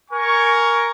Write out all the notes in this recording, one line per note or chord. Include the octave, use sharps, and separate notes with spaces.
A#4 G#5 C#6